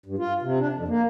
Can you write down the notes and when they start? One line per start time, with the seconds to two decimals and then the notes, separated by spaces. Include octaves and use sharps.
0.06 G2
0.18 F4
0.42 C3
0.59 D4
0.72 F2
0.88 A#3